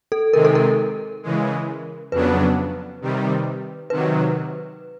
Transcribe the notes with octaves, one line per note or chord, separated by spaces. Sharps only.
A4
C3 D#3 G#3 A#4
A4
A#4
C#3 E3 G#3
F2 C#3 F#3 B3 D4 B4
C3 D#3 G3
C3 D#3 F#3 B4